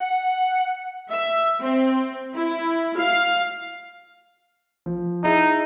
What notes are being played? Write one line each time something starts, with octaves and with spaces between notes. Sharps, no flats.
F#5
E5
C4
E4
F5
F3
D#4 E4 G#4